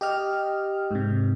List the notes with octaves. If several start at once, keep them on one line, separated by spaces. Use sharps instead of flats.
G4 D#5 F6
G#2 C3